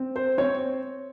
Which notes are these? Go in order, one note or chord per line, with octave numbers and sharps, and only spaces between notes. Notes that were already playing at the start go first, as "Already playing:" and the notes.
Already playing: C4
C5
C4 C#5